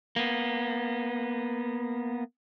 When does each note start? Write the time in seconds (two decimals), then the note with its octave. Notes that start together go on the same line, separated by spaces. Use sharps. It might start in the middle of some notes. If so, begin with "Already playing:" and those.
0.16 A#3 B3